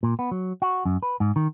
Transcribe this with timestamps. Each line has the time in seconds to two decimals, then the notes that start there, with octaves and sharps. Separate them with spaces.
0.03 A#2
0.19 B3
0.31 F#3
0.62 F#4
0.86 F#2
1.03 B4
1.20 G#2
1.36 D#3